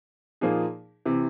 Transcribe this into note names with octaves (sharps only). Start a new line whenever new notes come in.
A#2 F3 A#3 D#4 G#4
C3 E3